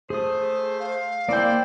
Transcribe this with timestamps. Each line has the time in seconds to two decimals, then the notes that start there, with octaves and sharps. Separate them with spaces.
0.10 A3 G#4 C5 D#6
0.80 F5
1.28 A#3 C4 E4 D5 G5